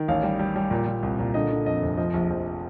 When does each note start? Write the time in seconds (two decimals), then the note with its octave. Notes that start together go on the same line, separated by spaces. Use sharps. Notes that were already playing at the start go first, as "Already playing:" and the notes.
Already playing: D#3
0.08 A1 F5
0.23 G3
0.39 G3
0.56 G3
0.71 A#2
0.86 A#2
1.03 C2
1.19 A#2
1.34 D3 D#5
1.51 D3
1.66 F2 D#5
1.82 F1
1.97 F3 D#5
2.14 A#1
2.30 A#1